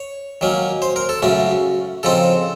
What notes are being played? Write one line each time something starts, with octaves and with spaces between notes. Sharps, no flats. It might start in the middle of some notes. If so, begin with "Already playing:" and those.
Already playing: C#5
D#3 F#3 A#3 C#4
C5
A#4
A4
F#2 C#3 A3 C#4 F#4
C#3 F3 C4 D#4 A4